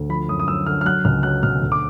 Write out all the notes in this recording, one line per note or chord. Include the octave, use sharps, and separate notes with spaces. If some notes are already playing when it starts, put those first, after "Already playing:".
Already playing: D2
F3 B5
F#2 D#6
D#6
F#2 E6
D3 F6
F6
F#3 F#6
C#2 F6
F#3 F#6
B2 F6
D2
D6